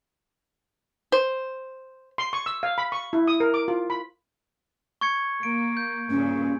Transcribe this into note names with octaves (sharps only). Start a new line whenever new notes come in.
C5
C6
C#6
E6
F5
B5
C#6
E4
D#6
A#4
D6
F4
B5
C#6 G#6 C#7
A#3 D7
G6
G2 A#2 C#3 C#4